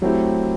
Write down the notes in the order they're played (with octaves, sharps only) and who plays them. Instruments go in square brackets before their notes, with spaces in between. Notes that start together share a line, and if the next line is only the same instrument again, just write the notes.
[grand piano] F#3 A3 C4 E4 G4